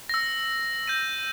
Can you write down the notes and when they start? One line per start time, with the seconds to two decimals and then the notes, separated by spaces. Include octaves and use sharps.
0.09 E6 A#6
0.87 G6 A#6 D#7